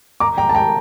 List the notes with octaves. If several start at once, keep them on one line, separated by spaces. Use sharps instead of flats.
A#5 D6
G5 A#5
A5
G5 A#5